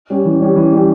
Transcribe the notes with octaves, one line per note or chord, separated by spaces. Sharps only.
G3 C#4 G4
E3
G3 C#4 G4
E3
G3 C#4 G4